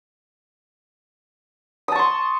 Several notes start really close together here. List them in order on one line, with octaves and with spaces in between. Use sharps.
D#6 A5 C#6 C6